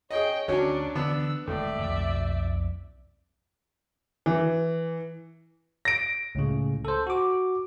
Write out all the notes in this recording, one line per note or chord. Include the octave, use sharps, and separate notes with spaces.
G#4 C#5 D#5 G5
D2 F#3 C#4 D4
D3 E3 B3 D4 E6
D#1 D2 A2 G#3 D5 E5
B1 F2 B2
E3
A#6 D7
C#2 A2 C#3
A4 C5
F#4 D6